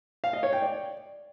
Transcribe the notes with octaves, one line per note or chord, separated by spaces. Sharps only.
F5
D#5
C#5
G5
D5